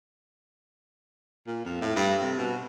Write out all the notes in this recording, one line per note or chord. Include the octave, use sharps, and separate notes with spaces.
A#2
F2
A2
G2
C3
B2